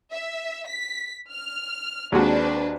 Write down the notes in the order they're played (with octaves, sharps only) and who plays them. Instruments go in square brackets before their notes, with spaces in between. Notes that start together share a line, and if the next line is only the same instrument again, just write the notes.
[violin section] E5
B6
F6
[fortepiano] D#2 G#3 F#4 [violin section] C4 D4 B4